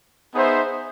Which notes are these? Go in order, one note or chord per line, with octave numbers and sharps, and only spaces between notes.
B3 D#4 G#4 C5 E5